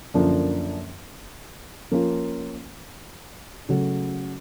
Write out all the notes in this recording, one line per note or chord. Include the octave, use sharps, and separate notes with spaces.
F#2 D3 F3 A#3 D4
F3 A#3 C#4 F4
C#3 F#3 A3